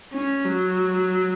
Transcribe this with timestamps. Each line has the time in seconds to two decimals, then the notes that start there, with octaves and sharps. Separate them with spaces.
0.13 C#4
0.45 F#3